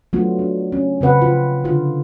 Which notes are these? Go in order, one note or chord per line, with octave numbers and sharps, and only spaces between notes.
F#3 A3 B3 D4 F4 F#4
D4
C#4
C#3 C4 B4 F#5
F4
D3 F4